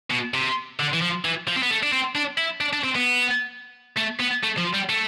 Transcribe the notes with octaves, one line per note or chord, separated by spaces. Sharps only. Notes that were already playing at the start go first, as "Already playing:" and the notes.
B2
C3
D3
E3
F3
E3
F3
C4
B3
A3
D4
C4
D4
E4
D4
D4
C4
B3
A3
B3
A3
F3
G3
A3